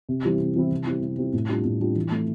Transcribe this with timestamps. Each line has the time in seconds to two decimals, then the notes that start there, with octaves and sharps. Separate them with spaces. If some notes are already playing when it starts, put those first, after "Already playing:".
0.09 C3
0.25 E3 G3 C4 E4
0.40 C3
0.56 E3 G3 C4 E4
0.71 C3
0.87 G3 C4 E4
1.02 C3
1.18 G3 C4 E4
1.34 A2
1.49 G3 D4 F4
1.65 A2
1.81 G3 D4 F4
1.96 E3
2.11 A3 E4